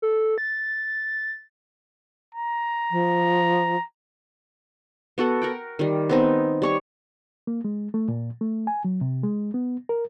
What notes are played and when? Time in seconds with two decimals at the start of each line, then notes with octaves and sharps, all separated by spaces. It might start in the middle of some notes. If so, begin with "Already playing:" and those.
0.02 A4
0.38 A6
2.35 A#5
2.91 F3
5.18 B3 F#4 A4 F#5
5.42 A#4 F#5 G5
5.79 D#3 G3
6.09 B3 C4 D#4
6.62 G3 C#5 C#6
7.47 A#3
7.65 G#3
7.94 A3
8.08 A#2
8.41 A3
8.67 G#5
8.85 F#3
9.01 C3
9.23 G#3
9.54 B3
9.89 A#4